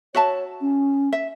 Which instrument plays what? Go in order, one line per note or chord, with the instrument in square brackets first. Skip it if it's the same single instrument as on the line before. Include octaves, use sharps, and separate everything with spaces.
[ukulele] F#4 E5 A5 [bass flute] C#5
[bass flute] C#4
[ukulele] E5